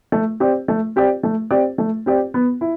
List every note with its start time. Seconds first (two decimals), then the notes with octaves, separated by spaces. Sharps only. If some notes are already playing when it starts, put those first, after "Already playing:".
0.12 A3
0.40 C4 G4 D5
0.68 A3
0.96 C4 G4 D5
1.23 A3
1.51 C4 G4 D5
1.78 A3
2.06 C4 G4 D5
2.34 B3
2.61 E4